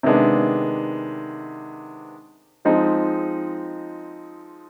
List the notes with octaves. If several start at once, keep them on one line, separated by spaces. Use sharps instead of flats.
C3 D#3 G#3 B3 D4
F3 G#3 C4 D#4